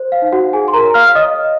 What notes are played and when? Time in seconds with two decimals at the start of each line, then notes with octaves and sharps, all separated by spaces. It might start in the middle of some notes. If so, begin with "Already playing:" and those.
Already playing: C5
0.12 F5
0.22 D#4
0.33 F#4 F#5
0.53 F#4 G#4 G#5
0.68 C6
0.74 A#4 A#5
0.84 C#5
0.94 F5 F6
1.15 C#5 D#5 D#6